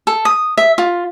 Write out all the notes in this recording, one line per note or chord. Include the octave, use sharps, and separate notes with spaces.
A4
D#6
E5
F4